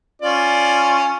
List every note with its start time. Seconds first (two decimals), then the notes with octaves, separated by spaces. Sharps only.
0.22 C#4 F4 D5